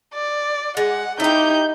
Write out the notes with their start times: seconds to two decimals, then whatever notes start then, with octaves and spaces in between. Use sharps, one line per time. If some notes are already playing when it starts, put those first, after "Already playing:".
0.14 D5
0.77 G#3 F#5
1.20 D#4 E4 G4 G6